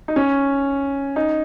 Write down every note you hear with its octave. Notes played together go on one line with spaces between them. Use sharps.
D#4
C#4
D#4